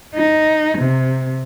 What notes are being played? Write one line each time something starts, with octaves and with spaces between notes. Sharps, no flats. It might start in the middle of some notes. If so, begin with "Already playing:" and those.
D#4
C3